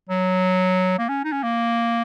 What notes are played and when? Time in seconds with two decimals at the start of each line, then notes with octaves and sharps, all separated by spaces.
0.10 F#3
0.99 A#3
1.09 C#4
1.24 D#4
1.32 C#4
1.43 A#3